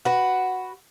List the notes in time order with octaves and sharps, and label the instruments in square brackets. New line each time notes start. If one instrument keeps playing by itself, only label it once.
[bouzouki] F#4 B4